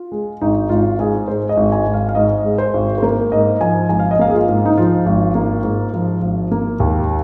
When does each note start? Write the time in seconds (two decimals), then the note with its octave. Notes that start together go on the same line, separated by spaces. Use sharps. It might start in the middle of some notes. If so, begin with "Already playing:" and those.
Already playing: F4
0.12 G#3
0.41 G#1 D#4
0.69 G#1 F4
0.99 G#2 G#4
1.28 G#3 C5
1.49 D#5
1.57 G#1
1.72 G#5
1.86 G#1
1.94 F5
2.09 F5
2.15 G#2 D#5
2.44 G#3
2.58 C5
2.74 G#1
2.98 C5
3.02 A#3 A#4
3.32 G#2 D#5
3.61 F3 G#5
3.89 G#1 G#5
4.00 F5
4.11 D#5
4.19 A#3 F5
4.30 G#4
4.34 F4
4.48 G#2
4.65 D#4
4.78 F3 F4
5.06 G#1
5.35 A#3
5.64 G#2
5.94 F3
6.22 G#1
6.51 A#3
6.80 D#2